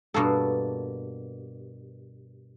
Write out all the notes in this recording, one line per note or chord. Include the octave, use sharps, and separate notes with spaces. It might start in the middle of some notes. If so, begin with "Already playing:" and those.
G2 B2 A#3 A4